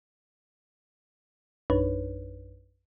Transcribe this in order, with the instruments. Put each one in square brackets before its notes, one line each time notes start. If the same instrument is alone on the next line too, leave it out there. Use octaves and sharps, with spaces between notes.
[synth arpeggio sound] A#1 F#2 D4 D#4 B4 C#5